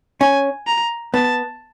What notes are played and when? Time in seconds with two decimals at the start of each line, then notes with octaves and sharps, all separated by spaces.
0.21 C#4 G#5
0.67 A#5
1.14 B3 A5